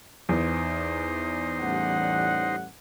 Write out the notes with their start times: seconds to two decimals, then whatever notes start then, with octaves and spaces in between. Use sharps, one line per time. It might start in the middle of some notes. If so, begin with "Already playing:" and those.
0.29 E2 D#4 C5
1.60 A1 G3 F#5